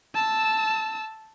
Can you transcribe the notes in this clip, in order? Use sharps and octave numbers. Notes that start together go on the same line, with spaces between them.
A5 E6